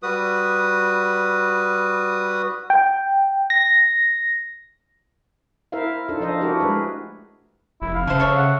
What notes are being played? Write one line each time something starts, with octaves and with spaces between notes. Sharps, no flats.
G3 F#4 B4 D#6
G5
A#6
E4 A#4 C5 E5 F5
D4 D#4 F4 A4
F3 D4 C5 D#5 F5
D4 E4 F#4 G4 A#4
G#3 A3 G#4 B4
F1 E4
F5
C#3 A3 C5
A4 C#5 E5
F#5